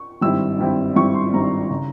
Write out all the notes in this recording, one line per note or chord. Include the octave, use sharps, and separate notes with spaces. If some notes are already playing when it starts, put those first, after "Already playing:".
Already playing: C#6
G#1 G2 G3 C4 E4 E6
G#1 G2 G3 C4 E4
G#1 G2 G3 C4 E4 C#6
C6
G#1 G2 G3 C4 E4 A#5
C#3